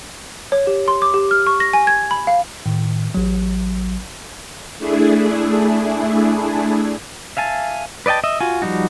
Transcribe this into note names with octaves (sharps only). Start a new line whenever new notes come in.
C#5
G4
C6
D6
G4
F6
C#6
A#6
G#5
G#6
B5
F5
A2 D#3
A1 F#3
A3 D4 E4 G#4
E5 F5 G#5 A5
B4 D5 D#5 G5 A5
D#5 E5
F4 F#4 G#5
F3 G3 D#4 F#4